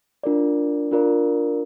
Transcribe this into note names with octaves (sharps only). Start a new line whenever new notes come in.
D4 F4 A#4 D5
D4 F4 A#4 D5